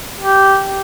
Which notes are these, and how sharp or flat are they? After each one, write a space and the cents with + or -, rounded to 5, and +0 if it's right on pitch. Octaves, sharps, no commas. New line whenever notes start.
G4 -10